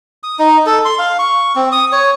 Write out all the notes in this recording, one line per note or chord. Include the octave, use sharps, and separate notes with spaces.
D#6
D#4
A4
C6
F5
C#6
C4
D#6
C#5